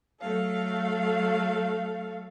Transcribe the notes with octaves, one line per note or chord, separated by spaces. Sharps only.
F#3 A3 A4 F5